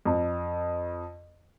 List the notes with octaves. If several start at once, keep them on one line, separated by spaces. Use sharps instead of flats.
F2